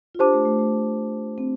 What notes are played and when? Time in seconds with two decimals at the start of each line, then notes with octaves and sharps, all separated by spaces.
0.15 F4
0.19 D4 G4 C5 A5 D6
0.33 A3
0.45 A3
0.59 A3
1.38 C4